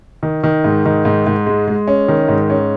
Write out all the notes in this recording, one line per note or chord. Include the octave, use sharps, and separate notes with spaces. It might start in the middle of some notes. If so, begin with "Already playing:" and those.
D#3
D#3
G#2
D#3
G#2
G#2
G#3
G#3
C#4
D#3
G#2
C#4